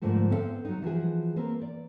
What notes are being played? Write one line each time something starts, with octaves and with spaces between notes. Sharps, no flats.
G#2 D3 F3 A3 A#3
B3 C4 A4 E5 F5
F#3 D#4
E3 F3 F#4 G#4
A#3 C4 B4
D5